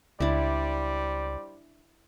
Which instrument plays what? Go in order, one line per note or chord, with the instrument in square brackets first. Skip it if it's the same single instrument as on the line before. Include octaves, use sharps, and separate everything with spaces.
[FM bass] C#2 [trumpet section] G3 C5 D5 [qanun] D4 E4